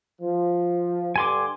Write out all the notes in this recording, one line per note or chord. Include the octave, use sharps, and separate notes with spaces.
F3
G2 D3 G#5 C6 D6